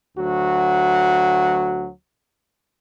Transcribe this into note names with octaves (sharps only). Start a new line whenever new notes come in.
D2 F#3 F#4